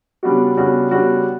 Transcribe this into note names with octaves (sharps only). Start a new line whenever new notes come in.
C#3 G3 B3 D4 F#4
C#3 G3 B3 D4 F#4
C#3 G3 B3 D4 F#4